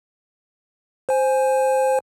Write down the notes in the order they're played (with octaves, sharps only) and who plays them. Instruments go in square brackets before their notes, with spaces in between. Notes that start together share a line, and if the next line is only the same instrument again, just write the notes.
[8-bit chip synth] C5 G#5